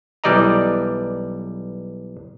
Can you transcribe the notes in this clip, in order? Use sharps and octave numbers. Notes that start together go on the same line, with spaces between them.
B1 E3 G3 D5 D#5 A#5